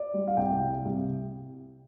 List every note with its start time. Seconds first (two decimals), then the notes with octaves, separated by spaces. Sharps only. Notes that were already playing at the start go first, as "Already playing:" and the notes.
Already playing: D5
0.14 G3
0.27 F5
0.37 C2 G5
0.62 G3
0.85 C2